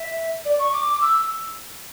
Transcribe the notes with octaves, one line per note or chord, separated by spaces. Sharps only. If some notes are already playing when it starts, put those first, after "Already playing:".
Already playing: E5
D5
C#6
D6
D6
E6